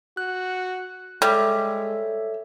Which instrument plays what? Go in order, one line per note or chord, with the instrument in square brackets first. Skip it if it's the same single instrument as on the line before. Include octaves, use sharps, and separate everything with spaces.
[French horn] F#4 [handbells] F#6
[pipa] G3 [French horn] G#3 [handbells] A4 C#5 E5